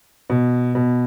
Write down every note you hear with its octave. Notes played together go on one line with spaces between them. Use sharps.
B2
B2